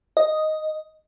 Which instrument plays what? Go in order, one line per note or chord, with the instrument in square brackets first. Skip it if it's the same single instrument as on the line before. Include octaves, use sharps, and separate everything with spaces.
[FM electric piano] D#5